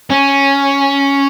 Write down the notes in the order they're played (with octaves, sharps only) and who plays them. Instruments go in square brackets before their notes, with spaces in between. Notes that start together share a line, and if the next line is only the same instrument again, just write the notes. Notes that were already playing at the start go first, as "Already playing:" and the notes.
[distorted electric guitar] C#4